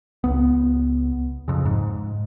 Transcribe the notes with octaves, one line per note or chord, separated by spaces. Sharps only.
C#2 B3
F2 C#3
G#2